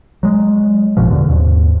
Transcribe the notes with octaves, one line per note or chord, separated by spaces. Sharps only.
F#3 G#3
A1 F#2 B2 F3
E2 B2 D3
D#2 G#2